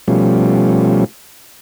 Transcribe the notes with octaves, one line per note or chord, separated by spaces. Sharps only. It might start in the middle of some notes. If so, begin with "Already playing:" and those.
B2 F3 G3 A3 C#4